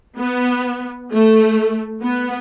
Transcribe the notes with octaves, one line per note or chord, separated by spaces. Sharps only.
B3
A3
B3